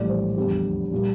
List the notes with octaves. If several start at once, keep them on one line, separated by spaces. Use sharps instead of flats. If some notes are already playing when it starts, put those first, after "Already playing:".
Already playing: A#1 A2 E3 G3 D5
C5
F1 E2 D3 G3 G4
A#2 G3